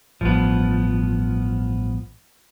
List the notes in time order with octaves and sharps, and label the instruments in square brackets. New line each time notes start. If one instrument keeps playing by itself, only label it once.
[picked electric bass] A1 G2 [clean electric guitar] F3 B3